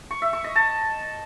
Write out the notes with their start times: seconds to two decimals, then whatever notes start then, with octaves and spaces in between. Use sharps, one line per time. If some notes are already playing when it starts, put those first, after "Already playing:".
0.11 C#6
0.22 E5
0.33 C#6
0.44 D#5
0.56 A5